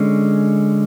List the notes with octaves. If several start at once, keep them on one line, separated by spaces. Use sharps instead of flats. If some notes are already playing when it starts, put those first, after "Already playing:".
Already playing: D3 G#3 C#4